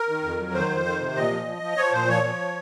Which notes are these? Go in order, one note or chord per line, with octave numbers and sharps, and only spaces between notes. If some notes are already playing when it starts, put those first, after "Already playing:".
Already playing: A#4
D#3
F2
F#3
D#3 C5
F2
D#3
C3
A#2 D#5
F3
F3
F3
F3 C#5
A#2 C5
F3 C#5
F3